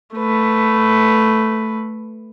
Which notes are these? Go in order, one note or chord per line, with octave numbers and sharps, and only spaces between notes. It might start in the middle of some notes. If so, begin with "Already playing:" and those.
A3 B4